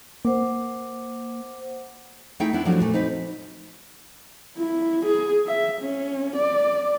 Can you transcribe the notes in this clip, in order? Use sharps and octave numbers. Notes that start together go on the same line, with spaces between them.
A#3 C5 F#5 D6
A3 D#4 E4 G#4 E5 G5
B3 D4 E4
F3 F#3 A3 C#4 D4 F#4
A#2 A3
C4 D#4 B4
E4
G#4
E5
C#4
D5